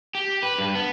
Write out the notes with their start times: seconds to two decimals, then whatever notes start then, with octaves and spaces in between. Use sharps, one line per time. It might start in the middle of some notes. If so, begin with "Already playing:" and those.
0.15 G4
0.43 B4
0.58 G2
0.75 B3